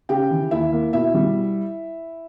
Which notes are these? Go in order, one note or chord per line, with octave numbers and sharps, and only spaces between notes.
C#3 G4 G5
E3
D#2 E4 E5
A#3
B2 E4 E5
G3